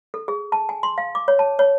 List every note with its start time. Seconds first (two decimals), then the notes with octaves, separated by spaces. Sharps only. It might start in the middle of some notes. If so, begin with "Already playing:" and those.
0.14 A4
0.28 G#4
0.52 A5
0.69 G#5
0.83 C6
0.98 F5
1.15 D6
1.28 C#5
1.39 A5
1.59 C#5